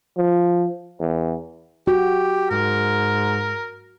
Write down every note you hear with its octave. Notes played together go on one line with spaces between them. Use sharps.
F3
E2
F#4 G4
G#2 A#4